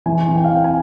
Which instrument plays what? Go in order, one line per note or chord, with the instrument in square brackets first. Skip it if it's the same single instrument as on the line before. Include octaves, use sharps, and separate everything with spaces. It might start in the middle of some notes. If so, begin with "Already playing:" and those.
[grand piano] E3 G#5
E3
G5
F5
C4 G5
G#5